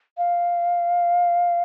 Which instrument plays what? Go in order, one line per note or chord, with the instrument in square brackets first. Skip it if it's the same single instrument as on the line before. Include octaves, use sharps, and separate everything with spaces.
[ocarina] F5